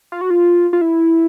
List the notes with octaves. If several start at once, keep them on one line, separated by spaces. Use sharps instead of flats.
F4
F#4
F4
F4
E4